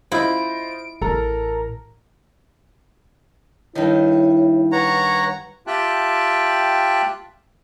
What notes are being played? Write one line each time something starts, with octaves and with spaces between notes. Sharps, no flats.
E4 F4 C5 D#5 D7
A1 A4 A#4 A#5
G2 D#3 E4 C#5
B4 C#5 F#5 A#5
F4 G4 E5 G5 A5 F#6